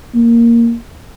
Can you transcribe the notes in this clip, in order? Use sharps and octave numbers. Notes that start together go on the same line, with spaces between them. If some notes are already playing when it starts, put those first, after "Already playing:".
A#3